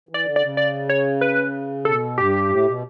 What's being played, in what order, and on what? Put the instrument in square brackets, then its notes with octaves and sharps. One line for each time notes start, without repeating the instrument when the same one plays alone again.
[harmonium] E3
[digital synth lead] D5
[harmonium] D3
[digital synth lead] D5
[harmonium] C#3
[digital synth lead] D5
C#5
B4
[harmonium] B2 [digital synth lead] A4
[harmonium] G2 [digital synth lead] G4
[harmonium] A2
B2